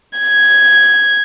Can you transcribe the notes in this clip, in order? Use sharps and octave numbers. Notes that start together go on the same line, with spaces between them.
G#6